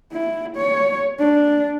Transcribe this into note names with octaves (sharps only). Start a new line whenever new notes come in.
E4
C#5
D4